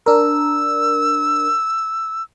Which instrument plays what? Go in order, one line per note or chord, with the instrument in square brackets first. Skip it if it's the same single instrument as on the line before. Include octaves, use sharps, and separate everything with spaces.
[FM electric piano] D4 A#4 [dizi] E6